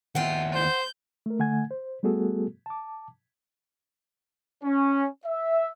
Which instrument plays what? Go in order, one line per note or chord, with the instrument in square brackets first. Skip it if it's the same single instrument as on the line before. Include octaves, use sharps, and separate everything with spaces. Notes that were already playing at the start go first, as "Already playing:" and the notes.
[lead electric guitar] D#2 E4 [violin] F4 [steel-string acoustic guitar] F#5 G5
[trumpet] C5 [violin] G6
[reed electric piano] A3 A#4
D3 A3 F#5 G#5 G#6
C5
G3 A3 B3 F#4 G#4 A4
A5 D6
[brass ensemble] C#4
E5